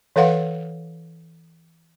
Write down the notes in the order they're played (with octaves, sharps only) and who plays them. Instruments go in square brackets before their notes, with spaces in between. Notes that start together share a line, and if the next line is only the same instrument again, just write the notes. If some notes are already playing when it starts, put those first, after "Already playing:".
[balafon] E3 A4 B4 F5 F#5